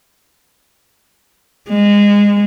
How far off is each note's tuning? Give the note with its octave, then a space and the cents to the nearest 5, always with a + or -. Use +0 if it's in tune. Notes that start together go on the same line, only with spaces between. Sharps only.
G#3 -25